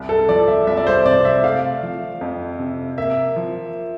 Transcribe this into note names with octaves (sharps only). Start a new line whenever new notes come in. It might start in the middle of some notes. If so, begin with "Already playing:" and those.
Already playing: C2
A4
F3 D5
E5
C2 E5
D5
C5
C3 D5
E5
A3 F5
F3
F2
C3
A#3 E5
F3